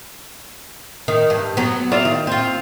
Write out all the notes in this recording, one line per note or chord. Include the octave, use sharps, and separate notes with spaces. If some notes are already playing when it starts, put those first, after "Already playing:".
D#3
G2
F#3 B3
F4 D5 E5
D#3
C4 F4